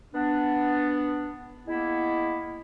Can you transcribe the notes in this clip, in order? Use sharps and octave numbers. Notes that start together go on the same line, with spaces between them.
B3 D4
G#3 A#3 B3 E4